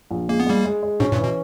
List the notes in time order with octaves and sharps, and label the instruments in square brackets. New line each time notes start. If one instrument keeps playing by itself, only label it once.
[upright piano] A#1
[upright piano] G#3 [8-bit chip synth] A#3
[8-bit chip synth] B3
[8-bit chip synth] G3 A#3 [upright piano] G#3
[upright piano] G#3
G#3
[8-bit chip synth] G#2 B2 [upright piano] C#4
[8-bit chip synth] G2 A#2
[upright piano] E3
[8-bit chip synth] B2